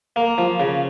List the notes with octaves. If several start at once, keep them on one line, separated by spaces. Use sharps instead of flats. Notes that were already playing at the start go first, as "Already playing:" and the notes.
A#3
F3
C#3